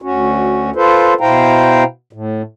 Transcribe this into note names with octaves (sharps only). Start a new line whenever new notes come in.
D2 C#4 F#4
F4 A4 B4 C5
B2 E4 C5 F5 G5 A#5
A2